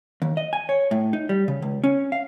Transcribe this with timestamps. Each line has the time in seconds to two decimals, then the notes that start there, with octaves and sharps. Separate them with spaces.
0.22 D#2
0.37 D#5
0.53 G#5
0.69 C#5
0.91 A2
1.13 D#4
1.29 G3
1.48 C#3
1.62 C#2
1.84 C#4
2.12 F5